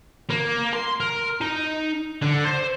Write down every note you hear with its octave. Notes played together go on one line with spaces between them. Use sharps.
A#3
C6
A#4
D#4
D3
C5